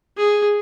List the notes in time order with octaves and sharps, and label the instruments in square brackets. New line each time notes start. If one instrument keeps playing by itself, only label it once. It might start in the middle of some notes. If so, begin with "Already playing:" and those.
[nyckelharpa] G#4